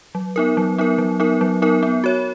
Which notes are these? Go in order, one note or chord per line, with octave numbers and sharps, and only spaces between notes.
F#3
B3 D#4 A#4
F#3
B3 D#4 A#4
F#3
B3 D#4 A#4
F#3
B3 D#4 A#4
B3
F#4 C#5